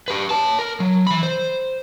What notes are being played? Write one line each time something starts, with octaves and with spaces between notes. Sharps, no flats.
G4 B4
C#5 A5
A#4
F#3
E3 B5
C5